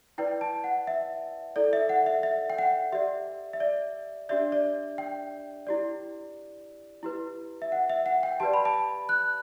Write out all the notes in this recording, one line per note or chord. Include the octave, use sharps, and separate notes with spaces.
E4 B4 D5 G5
A5
F#5
E5
E4 A4 D5
E5
F#5
E5
E5
G5
F#5
G4 D5 E5
E5
D5
D4 G4 D5 E5
D5
G5
E4 G4 D5
E4 G4 B4
E5
F#5
E5
F#5
G5
G4 B4 D5 A5
B5
A5
F#6